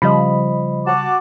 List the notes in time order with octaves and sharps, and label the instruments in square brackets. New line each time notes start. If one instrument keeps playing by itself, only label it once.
[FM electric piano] C#3 G3 [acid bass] F3 [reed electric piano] D#5 B5
[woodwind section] F#4 A5 D6